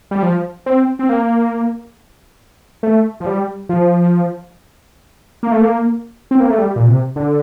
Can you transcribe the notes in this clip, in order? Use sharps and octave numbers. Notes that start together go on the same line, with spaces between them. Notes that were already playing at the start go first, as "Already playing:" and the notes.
G3
F3
C4
C4
A#3
A3
F3
G3
F3
A#3
A3
A#3
C4
A#3
A3
G3
A#2
C3
D3